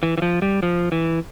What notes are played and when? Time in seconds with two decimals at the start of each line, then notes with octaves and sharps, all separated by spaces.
0.03 E3
0.18 E3
0.22 F3
0.42 G3
0.63 F3
0.92 E3